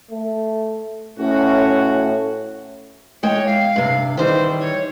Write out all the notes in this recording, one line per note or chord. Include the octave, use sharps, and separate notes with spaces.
A3
A2 C#4 F#4
E2 G#3 C#5 G5
F5
G2 C3
D#3 E3 G3 C5
C#5